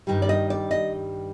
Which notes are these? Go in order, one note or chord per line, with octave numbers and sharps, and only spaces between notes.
G2 D#3 G3
D5
D#5
D5
D#5